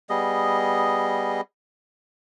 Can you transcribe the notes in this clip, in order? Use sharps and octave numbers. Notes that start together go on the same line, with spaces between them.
G3 B3 G#4 D#5